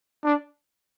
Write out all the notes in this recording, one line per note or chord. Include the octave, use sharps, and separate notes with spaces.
D4